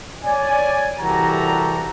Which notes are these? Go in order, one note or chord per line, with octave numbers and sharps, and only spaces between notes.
C#5 D5 G#5
C2 E3 F#4 G4 A4 A#5